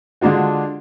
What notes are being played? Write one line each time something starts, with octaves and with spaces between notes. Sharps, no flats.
D3 G#3 D4 F4 F#4